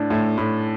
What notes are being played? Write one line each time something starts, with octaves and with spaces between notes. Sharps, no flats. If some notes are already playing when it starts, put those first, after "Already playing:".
Already playing: A2 D4
A2
A2